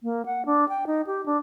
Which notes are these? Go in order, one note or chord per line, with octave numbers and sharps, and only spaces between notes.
A#3
F#5
D4
G5
D#4
G4
D4